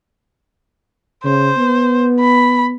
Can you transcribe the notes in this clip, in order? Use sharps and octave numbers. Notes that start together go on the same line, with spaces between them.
C#3 C5
B3
B5